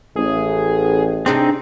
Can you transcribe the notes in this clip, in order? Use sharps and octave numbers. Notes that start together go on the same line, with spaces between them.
A1 G#4
C3 C4 D4 D#4 G#4